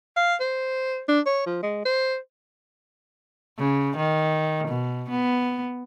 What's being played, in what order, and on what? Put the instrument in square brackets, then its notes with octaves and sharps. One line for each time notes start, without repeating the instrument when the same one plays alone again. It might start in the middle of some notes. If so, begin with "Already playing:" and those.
[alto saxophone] F5
C5
D4
C#5
F3
G#3
C5
[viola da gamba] C#3
D#3
B2
B3